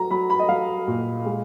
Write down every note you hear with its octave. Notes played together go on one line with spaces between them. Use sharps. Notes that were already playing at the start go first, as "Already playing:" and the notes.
Already playing: F#3 A#5
F#3 B5
B5
D#5
F#3 F5
A#2
G#3